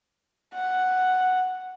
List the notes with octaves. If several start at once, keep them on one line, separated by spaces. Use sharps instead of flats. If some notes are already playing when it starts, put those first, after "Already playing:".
F#5